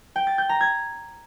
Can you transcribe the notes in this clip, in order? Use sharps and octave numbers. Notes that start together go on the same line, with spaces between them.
G5
A6
G6
A#5
G#6